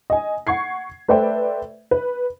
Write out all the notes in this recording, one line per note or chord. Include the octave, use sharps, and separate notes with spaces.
D#5 G#5
F#5 C#6 G#6 C7
A3 B4 C5 D5 E5 G5
B4